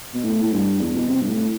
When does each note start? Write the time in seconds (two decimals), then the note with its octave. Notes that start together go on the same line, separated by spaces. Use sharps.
0.14 B2
0.24 A2
0.43 A2
0.52 G2
0.80 E2
0.96 B2
1.08 C3
1.21 G2
1.28 A2